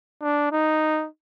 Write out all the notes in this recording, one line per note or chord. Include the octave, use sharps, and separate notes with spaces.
D4
D#4